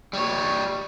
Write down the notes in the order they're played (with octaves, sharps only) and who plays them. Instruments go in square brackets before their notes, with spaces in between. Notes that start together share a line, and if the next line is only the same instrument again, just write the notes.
[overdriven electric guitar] G3 C#5